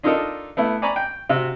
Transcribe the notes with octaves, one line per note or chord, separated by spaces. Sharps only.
D4 D#4 F4 A4 A#4 D#5
A3 B3 E4
D5 G#5 A#5 B5 C#6 D6
G5
C3 F#4